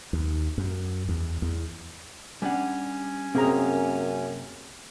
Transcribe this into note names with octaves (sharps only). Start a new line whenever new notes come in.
D#2
F#2
E2
E2
G3 C#4 D4 F#5
F#2 C3 A#3 C4 G#4 A#5